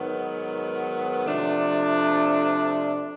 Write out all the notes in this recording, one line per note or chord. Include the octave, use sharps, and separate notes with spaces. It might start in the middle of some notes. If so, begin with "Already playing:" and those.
Already playing: G#2 D#3 F#3 B3
C3 F3 A3 D4